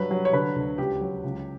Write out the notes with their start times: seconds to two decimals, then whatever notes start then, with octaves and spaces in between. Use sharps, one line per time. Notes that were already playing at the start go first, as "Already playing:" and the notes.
Already playing: G2 F#3 B4
0.11 F#3
0.25 C#5
0.33 D3 B4
0.56 D2
0.78 C#2 G4
1.01 F#3
1.24 C#2